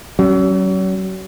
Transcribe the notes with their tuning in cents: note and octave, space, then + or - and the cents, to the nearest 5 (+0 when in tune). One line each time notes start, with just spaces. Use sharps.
F#3 +35 C#4 -10